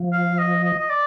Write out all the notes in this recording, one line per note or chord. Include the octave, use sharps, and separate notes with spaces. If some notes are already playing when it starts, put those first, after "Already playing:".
Already playing: F3
F5
D#5
D#5
D#5
D5